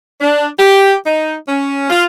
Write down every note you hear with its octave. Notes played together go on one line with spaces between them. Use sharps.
D4
G4
D#4
C#4
F4